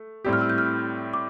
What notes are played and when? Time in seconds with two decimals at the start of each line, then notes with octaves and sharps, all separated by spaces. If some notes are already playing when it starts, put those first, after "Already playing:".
Already playing: A3
0.24 A2 G3 C4 G4
0.33 F6
0.41 E6
0.50 G6
0.58 F6
1.14 D6